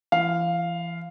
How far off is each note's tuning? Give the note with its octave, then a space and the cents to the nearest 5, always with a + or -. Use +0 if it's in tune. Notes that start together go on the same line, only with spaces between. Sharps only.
E3 +40 F5 +0